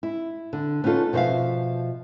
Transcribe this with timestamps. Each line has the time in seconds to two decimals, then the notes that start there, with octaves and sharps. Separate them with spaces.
0.03 E4
0.53 D3
0.84 B3 C#4 D#4 F4 A4
1.13 B2 F3 C5 E5 F5